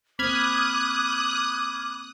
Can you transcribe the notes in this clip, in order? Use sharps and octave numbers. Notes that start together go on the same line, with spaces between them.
A#3 C4 B5 D6 D#6 F6 F#6 G#6